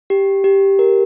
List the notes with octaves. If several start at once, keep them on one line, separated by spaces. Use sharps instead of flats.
G4
G4
A#4